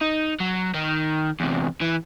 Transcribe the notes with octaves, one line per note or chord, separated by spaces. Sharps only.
D#4
F#3
D#3
E2 C3
E3